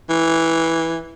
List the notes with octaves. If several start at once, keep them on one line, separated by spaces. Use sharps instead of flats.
E3